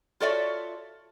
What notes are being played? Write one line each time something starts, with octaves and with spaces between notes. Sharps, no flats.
F4 F#4 A4 C#5 D5 E5